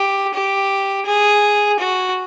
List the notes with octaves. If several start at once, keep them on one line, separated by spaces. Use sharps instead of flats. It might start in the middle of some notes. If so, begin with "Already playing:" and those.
Already playing: G4
G4
G#4
F#4